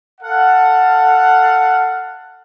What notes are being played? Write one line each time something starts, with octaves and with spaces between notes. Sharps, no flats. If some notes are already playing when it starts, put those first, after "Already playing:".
A4 F5 F#5